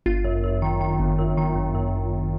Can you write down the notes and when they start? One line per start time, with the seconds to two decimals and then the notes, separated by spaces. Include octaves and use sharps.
0.06 G1 F4
0.24 F#2
0.44 F#2
0.62 D#3
0.81 D#3
1.00 G1
1.19 F#2
1.37 D#3
1.56 G1
1.75 F#2